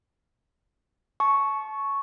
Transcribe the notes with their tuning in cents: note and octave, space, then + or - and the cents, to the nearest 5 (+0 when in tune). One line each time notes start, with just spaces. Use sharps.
A5 -30 C#6 +0